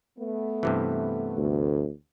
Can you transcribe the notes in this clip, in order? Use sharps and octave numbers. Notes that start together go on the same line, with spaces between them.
A3 B3
G2 C3 E3
D2